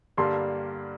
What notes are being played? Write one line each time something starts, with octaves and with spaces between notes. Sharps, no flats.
G2 D3 G3 A#3 A5 C6